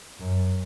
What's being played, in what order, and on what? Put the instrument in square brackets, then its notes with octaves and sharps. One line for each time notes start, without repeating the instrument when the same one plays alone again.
[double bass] F#2